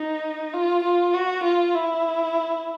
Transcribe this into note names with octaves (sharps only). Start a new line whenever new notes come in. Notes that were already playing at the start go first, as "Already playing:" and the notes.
Already playing: D#4
F4
F4
F#4
F4
E4